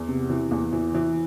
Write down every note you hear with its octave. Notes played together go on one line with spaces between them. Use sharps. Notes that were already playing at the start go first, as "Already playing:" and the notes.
Already playing: E2
C3
E3
E2
E3
E3